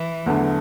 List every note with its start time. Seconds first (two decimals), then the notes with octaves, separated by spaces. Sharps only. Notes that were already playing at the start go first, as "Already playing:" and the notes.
Already playing: E3
0.26 E2 D3 F#3 A3